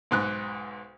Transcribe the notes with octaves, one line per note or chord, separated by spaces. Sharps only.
B1 G#2 F#6